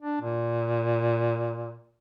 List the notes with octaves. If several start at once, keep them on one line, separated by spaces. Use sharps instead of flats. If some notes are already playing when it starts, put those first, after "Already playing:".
D4
A#2